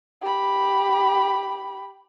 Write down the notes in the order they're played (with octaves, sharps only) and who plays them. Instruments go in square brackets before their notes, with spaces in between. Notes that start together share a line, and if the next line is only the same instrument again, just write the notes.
[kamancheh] G4 B5